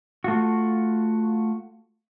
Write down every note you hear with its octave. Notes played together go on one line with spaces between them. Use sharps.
A3 F4 F#4